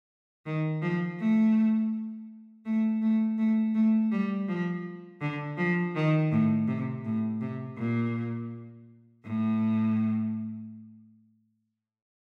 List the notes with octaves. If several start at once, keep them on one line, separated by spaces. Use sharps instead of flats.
D#3
F3
A3
A3
A3
A3
A3
G3
F3
D3
F3
D#3
A2
C3
A2
C3
A#2
A2